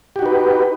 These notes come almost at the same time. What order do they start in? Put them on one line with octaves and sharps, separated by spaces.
G4 F#4 D#4 B4